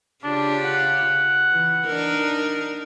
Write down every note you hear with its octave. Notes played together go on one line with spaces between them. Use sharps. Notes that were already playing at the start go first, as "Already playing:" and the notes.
C#3 D4 F4 G4
F#5
E3
D4 D#4 A#4